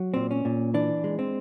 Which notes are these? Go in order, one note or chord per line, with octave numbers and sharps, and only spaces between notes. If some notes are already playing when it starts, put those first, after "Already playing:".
Already playing: F#3
A#2 C4
C#4
A#2
E3 D4
G#3
C4